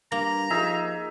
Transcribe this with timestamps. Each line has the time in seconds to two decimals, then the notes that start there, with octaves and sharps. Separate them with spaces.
0.12 G2 A#3 A#5
0.50 F3 D#4 G#4 E5